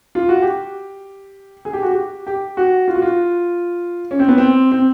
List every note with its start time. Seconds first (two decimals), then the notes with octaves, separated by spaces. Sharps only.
0.15 F4
0.29 F#4
0.42 G4
1.65 G#4
1.73 G4
1.83 F#4
1.91 G4
2.27 G4
2.57 F#4
2.88 F4
2.95 F#4
3.02 F4
4.11 C#4
4.19 C4
4.28 B3
4.38 C4
4.72 C4